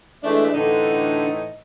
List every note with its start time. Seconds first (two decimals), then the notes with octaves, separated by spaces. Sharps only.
0.24 E3 G#3 A3 D4
0.54 A2 D3 E3 D#4